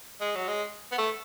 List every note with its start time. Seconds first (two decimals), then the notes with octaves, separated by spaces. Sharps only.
0.21 G#3
0.35 F#3
0.48 G#3
0.92 B3
0.98 A3